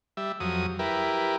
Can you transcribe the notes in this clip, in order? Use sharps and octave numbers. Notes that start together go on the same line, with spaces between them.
G3 E5
F2 F#3 D#6
E4 G4 A#4 B4